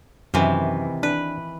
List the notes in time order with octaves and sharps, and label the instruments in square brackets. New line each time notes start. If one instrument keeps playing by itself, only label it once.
[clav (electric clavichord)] F#2 [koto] C3 D#3 E3
[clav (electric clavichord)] D4 [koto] B4